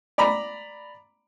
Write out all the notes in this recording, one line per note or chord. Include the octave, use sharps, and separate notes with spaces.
D5 A#5 B5